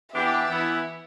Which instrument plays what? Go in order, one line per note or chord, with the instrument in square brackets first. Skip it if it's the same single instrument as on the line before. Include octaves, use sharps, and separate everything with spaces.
[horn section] E3 B3 D4 G4 [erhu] E5
[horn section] E3 B3 E4